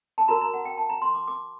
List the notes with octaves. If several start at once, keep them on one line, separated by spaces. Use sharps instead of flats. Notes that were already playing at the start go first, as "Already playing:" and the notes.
A5
F#4 A#4 A#5
A#5
F#5
G5
A5
A#5
C6
D6
D6